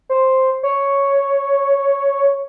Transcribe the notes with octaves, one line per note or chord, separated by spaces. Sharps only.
C5
C#5